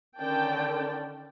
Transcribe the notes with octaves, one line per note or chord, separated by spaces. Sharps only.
D3 D#3 C#4 D5 G5 A5